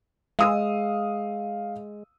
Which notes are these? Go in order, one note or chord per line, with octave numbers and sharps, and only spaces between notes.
G#3 F5 D#6 E6